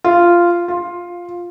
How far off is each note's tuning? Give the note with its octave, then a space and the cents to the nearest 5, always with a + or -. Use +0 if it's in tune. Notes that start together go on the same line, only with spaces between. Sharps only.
F4 -10
F4 +5